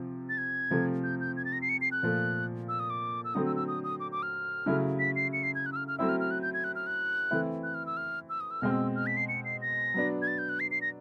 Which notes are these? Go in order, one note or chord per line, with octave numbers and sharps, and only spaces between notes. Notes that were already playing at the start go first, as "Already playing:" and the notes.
Already playing: C3 F3
A6
G#6
C3 F3 A3
G6
G6
G#6
A6
A#6
C7
C#7
C7
F#6
A#2 F3 A3
E6
D#6
D6
E6
D3 F#3 A3 C4 D#6
E6
E6
D#6
D#6
D6
D6
F6
C#3 F#3 A3 C#4 E4
B6
C7
C#7
C7
G#6
F#6
E6
F6
F6
F#3 A3 C4 E4 E6
F6
F6
F#6
G6
G#6
F#6
F6
F#6
E3 A3 C4 E4
F#6
F6
E6
F6
E6
D#6
E6
B2 G#3 C4 F6
E6
F6
B6
C7
C#7
C7
A#6
F#3 B3 D4
G#6
A6
G6
F#6
C7
C7
A#6